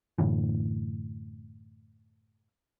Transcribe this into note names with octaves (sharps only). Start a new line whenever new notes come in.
F#2 A2 D3 E3